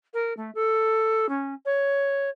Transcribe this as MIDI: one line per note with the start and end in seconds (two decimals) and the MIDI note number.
0.14 0.33 70
0.37 0.51 57
0.55 1.29 69
1.29 1.54 61
1.66 2.29 73